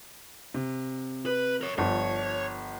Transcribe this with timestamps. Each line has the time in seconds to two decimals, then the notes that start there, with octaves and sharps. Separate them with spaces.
0.54 C3
1.26 B4
1.61 A#4 C#5
1.78 G1 F3 C#5